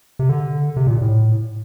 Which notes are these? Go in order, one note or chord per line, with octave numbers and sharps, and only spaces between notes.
C3
D3
C3
A#2
A2